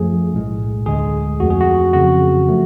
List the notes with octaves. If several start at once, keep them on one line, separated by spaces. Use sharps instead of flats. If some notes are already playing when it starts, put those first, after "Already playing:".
Already playing: F#2 F3 A3 G#4
B1 A2 G#3
D2 D3 G#3 G#4
F2 F3 A3 F#4
G#4
F#4
F2 C#3 F#3 F#4
F3 A3